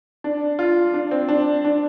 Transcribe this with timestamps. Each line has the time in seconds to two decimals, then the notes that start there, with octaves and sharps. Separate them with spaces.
0.24 D4
0.59 F4
0.94 D4
1.11 C4
1.29 D4
1.64 D4